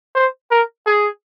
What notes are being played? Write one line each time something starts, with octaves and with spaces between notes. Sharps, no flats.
C5
A#4
G#4